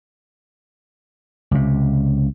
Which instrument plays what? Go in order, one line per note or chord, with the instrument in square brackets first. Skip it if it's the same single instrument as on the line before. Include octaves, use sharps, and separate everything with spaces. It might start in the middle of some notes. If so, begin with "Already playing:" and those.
[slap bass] C#2 C3